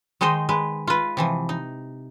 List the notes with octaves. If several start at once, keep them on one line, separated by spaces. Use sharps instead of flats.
D#3 G#3 D#4 C5 D#5
G#3 B4
F4 B4
C3 E3 F3
D#4